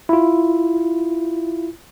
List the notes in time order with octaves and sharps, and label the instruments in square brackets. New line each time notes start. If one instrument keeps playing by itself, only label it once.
[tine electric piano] E4 F4